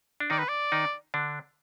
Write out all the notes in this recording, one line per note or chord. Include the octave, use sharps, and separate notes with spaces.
D4
D#3 D#4 D5
B4
D5
D#3 D#4
D3 D4